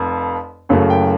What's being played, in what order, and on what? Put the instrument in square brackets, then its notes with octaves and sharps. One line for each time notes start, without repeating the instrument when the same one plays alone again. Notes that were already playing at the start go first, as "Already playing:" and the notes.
Already playing: [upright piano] F1 F2
F#1 F#2 C#3 F#3 A3
G5